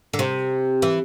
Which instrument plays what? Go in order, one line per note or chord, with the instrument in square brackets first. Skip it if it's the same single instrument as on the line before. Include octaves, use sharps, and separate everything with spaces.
[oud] D3
C3
E3